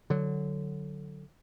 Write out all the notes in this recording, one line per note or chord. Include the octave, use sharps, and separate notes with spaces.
D3 F#3